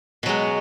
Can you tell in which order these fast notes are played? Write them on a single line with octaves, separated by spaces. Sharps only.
B2 F#3 G#3